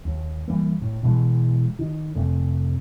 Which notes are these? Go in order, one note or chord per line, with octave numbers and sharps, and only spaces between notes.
D#2
E3 G3 A#3
A2
B2 E3 G#3
D#3
F1 C3 A3